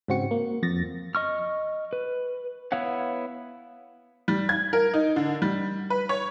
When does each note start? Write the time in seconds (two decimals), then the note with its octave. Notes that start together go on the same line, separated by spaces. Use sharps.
0.08 G#2 C#3 C4 F#4 C#7
0.31 A#3
0.63 F2 A6 A#6
1.15 D#5 C#6 F6
1.93 B4
2.72 B3 E4 C#5 F5 F#5
4.28 G3
4.49 G#6
4.73 A#4
4.94 D#4
5.16 D3
5.42 G3
5.90 B4
6.09 C#5